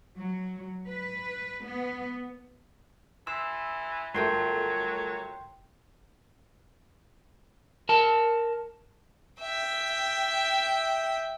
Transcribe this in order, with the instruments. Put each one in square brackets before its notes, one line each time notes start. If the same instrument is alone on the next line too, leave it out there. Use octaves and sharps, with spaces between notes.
[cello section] F#3
B4
B3
[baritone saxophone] E3 [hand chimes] C6 [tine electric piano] E6
[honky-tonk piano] G1 A3 [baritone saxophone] F#3 [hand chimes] F4 A#4 A5 [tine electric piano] G5 C6
[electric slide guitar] A#4 A5
[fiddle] E5 G5